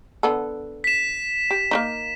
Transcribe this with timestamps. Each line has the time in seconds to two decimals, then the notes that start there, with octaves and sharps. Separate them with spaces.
0.23 D3 B3 A4
0.84 B6 E7
1.51 G4
1.71 A#3 D4 D#4